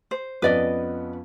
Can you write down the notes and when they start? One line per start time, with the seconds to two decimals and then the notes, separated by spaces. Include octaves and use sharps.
0.11 C5
0.42 F2 B3 C#4 B4 D5 D#5